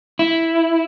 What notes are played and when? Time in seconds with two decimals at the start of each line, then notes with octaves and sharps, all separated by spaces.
0.19 E4